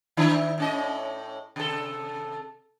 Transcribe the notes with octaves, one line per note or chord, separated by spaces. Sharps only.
D#3 D4 E4
A2 C#4 D#5
C3 A4